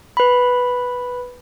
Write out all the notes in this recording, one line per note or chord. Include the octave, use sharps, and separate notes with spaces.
B4 B5